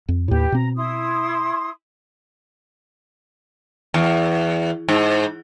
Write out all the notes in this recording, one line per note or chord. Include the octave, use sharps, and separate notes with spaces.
F2
D#2 A2 G4 B4
B2 C4 A#5
E4 C6 D#6
E2
G#2